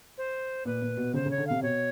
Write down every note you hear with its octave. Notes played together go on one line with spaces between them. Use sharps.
C5
A#2 B4
A#2
B2
C#3 C5
C#3 C#5
D3
C3 F5
B2 C#5